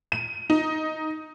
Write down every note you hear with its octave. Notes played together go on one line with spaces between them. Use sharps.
D#7
D#4